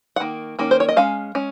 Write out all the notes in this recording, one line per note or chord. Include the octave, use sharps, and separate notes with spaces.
F#5
D#3 A#3
D#3 A#3 C#4
C5
C#5
D#5
G#3 C#4 F5
G#3 C#4